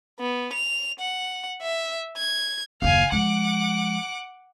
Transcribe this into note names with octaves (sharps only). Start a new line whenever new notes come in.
B3
F7
F#5
E5
G#6
F#1 D#2 F5 G#5
F3 G#3 F#5 D6